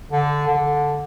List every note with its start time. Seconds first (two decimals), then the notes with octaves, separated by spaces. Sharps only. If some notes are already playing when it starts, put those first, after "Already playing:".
0.11 D3
0.48 D3